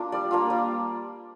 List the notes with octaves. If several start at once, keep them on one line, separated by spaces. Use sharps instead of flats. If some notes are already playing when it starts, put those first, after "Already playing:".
Already playing: A#3 D4 F4
G3 D5
A#3 D4 F4
G3